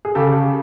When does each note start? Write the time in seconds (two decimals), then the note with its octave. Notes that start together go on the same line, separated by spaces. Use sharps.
0.05 G#4
0.15 C#3 G4 A4